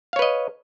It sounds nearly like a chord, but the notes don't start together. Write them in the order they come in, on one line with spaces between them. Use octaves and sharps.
F5 C#5 B4 D#5